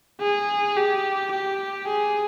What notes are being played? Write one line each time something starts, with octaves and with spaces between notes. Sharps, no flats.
G#4
G4
G4
G#4